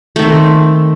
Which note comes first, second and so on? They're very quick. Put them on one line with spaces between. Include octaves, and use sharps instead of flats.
A3 D#3 C4